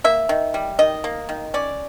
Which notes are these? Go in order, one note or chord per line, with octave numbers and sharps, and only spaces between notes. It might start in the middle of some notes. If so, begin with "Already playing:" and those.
A#3 E5
D#3
G3
D#3 D#5
A#3
D#3
C#4 D5